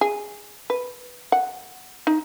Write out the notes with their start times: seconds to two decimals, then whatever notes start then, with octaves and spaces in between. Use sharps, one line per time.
0.01 G#4
0.70 B4
1.32 F#5
2.07 D#4